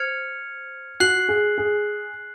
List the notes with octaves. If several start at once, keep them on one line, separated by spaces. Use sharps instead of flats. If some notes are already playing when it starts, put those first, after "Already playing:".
Already playing: C5 F6 G#6 C#7 F7
F#4 F#6 C7 F#7
G#4
G#4